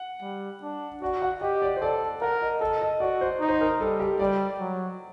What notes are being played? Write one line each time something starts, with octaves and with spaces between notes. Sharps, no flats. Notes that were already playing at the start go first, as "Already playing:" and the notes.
Already playing: F#5
G3
D4
F#4 D5
F#5
G4 D#5
D5
C5
A4 D5
A#4 F#5
D#5
A4 D#5
D#5
F#4 D5
C5
D#4
C5
A#4
G3 A4
G4
G3 D5
F#3